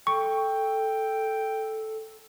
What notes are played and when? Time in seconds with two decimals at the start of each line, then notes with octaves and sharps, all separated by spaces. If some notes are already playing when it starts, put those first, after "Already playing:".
0.07 A4 G5 C#6